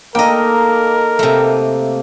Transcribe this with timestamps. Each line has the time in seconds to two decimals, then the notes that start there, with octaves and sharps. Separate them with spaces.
0.15 A#3 D#4 A4 A#4 D#5 G5
1.19 C3 A3